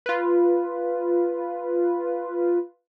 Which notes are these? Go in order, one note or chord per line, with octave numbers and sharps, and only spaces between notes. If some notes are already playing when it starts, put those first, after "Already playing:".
F4 B4